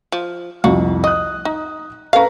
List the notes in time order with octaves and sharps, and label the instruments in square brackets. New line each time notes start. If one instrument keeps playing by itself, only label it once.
[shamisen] F3
[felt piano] C2 F2 [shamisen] F#4 F5
[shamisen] D#5 [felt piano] D#6 F#6
[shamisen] D#4
[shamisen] C#4 F5 [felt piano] A4 B4 A#5